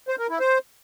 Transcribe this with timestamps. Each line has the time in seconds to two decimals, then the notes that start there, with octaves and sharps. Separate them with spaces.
0.08 C5
0.19 A#4
0.29 E4
0.40 C5